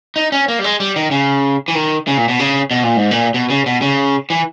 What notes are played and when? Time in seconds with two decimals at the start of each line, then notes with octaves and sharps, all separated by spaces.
0.16 D#4
0.32 C#4
0.48 A#3
0.59 G3
0.64 G#3
0.80 G3
0.96 D#3
1.11 C#3
1.68 E3
1.75 D#3
2.07 C#3
2.17 A#2
2.29 B2
2.39 C#3
2.71 B2
2.83 A#2
2.97 G#2
3.11 A#2
3.34 B2
3.50 C#3
3.66 B2
3.82 C#3
4.30 E3